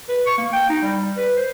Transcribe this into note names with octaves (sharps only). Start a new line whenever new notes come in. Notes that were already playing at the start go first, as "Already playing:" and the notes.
B4
C#6
A#3
G5
D#4
G3
B4
C5